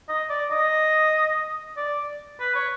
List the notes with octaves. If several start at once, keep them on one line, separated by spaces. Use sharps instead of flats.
D#5
D5
D#5
D5
B4
C#5